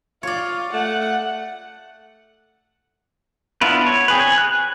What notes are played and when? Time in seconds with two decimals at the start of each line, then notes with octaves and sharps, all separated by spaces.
0.23 F4 C#5 D5
0.73 A3 F#5
3.61 B3 D4 E4 F4 B4
3.86 C#5
4.08 C4 G#4 B4
4.20 G#5
4.38 F#6